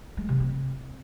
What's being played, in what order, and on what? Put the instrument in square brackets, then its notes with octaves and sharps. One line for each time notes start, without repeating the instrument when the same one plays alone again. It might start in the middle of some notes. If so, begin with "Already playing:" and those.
[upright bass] G#3
C3
C4